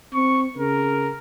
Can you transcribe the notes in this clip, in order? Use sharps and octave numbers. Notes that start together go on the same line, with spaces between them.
C4 C#6
C#3 A#4